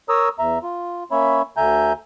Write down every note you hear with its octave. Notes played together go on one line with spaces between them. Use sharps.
A#4 C#5 A#5 D#6 E6
E2 E5 A#5
F4
A#3 C#4 C#5 E5 B5
D2 D3 E5 G#5 A#5 G6